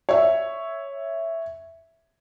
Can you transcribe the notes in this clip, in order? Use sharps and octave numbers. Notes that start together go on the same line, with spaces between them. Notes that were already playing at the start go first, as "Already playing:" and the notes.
C#5 E5